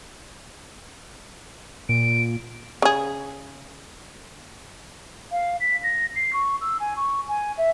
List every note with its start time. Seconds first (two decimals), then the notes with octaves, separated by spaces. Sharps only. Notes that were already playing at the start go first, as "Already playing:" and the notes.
1.89 A#2 D7
2.82 C#3 G#4
5.31 F5
5.60 B6
5.83 A#6
6.15 C7
6.33 C#6
6.61 E6
6.80 G#5
6.97 C#6
7.28 G#5
7.57 E5